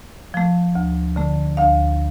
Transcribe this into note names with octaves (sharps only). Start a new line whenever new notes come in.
F3 A3
D2
D3 A3
D2 F5